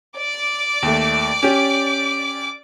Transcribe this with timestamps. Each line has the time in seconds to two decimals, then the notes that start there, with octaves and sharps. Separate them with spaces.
0.18 D5 D6
0.83 D#2 A3
1.43 C#4 G4